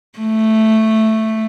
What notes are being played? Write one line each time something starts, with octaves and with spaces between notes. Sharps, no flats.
A3